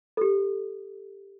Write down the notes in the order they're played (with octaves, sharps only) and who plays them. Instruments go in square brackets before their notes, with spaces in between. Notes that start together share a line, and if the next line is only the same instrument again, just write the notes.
[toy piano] G4 A4